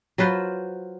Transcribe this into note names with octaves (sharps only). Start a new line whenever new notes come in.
F#3 F4 B4 C5